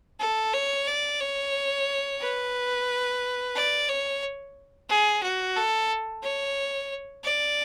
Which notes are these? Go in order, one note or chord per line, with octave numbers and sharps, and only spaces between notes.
A4
C#5
D5
C#5
B4
D5
C#5
G#4
F#4
A4
C#5
D5